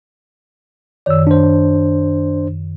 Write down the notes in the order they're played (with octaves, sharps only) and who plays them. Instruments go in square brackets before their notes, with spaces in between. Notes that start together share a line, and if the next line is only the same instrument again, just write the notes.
[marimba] F#2 D#3 C#5 [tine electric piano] D5 E6
[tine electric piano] D4 C5